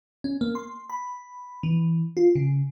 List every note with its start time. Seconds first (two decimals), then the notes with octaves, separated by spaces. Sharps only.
0.24 C#4
0.41 A#3
0.55 C6
0.90 B5
1.63 E3
2.17 F4
2.35 C#3